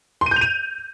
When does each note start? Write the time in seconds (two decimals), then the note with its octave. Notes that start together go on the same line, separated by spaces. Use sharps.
0.21 C6
0.26 D#7
0.31 G6
0.36 F7
0.41 D#7